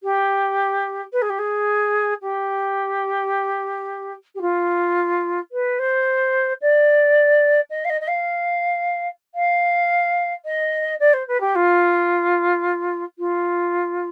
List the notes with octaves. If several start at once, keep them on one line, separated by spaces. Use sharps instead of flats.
G4
B4
G#4
G4
G#4
G4
G4
F4
B4
C5
D5
D#5
F5
D#5
D#5
F5
F5
D#5
D5
C5
B4
G4
F4
F4